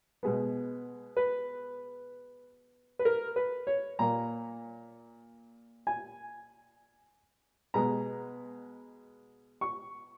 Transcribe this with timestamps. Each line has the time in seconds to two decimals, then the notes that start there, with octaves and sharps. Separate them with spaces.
0.23 B2 G#3 B3
1.17 B4
2.99 B4
3.05 A#4
3.36 B4
3.67 C#5
3.99 A#2 A#3 A#5
5.87 G#5
7.74 B2 G#3 B3 A#5
9.61 C#6